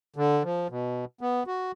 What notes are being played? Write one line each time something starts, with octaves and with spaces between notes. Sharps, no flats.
D3
F3
B2
B3
F#4